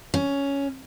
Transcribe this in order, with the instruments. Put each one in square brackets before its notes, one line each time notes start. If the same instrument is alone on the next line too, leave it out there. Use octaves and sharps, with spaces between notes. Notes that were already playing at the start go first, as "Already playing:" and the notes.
[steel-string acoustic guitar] C#4